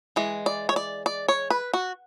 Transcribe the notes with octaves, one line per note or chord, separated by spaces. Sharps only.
E3 G#3
D5
C#5
D5
D5
C#5
B4
F#4